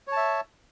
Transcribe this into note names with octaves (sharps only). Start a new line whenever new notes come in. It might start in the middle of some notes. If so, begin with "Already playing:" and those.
C#5 E5 A5